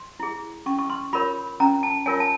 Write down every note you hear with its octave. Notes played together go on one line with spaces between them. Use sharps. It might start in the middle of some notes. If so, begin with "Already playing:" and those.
Already playing: C6
E4 G#4
C#4 C#6
C#6
C6
F4 A#4 C#5 B5
C#4 A#5
A5
F4 A#4 C#5 G#5
A5